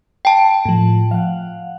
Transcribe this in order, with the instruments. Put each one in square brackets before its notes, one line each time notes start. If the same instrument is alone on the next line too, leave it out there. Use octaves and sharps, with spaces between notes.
[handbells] G5 A5
[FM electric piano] A2 F3
F5 F#5